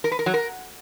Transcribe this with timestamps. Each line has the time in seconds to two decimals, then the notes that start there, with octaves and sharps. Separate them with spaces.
0.04 A#4
0.12 B4
0.19 A#4
0.26 F#3
0.34 A#4